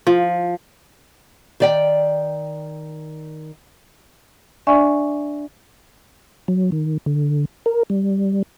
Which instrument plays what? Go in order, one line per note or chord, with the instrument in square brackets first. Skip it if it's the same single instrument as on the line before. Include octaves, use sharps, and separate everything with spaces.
[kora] F3
[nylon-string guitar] D#3 D5 G5
[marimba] D4 D5 E5 G#5 C#6
[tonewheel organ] F#3
D#3
D3
A#4
G3